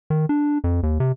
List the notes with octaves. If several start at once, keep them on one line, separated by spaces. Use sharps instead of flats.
D#3
D4
F2
D#2
C3